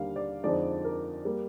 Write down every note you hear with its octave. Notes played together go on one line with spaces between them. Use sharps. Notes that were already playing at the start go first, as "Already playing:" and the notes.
Already playing: D#2 D3 G3 A#3 F5
D5
F2 D3 F3 G#3 D#4 D5
A#4
G3 A#3 A#4